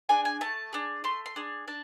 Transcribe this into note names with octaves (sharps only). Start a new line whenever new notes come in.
D4 G#4 G#5
G#5
A3 A5
D4 G#4
A3 C6
C6
D4 G#4
D4 A5